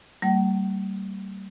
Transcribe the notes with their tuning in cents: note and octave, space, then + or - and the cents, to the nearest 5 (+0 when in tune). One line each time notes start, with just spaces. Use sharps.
G3 -25 A#3 -40 F#5 +45